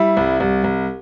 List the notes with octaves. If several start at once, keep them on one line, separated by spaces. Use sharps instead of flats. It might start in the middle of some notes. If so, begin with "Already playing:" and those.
Already playing: G3 E4
C2
C2
C2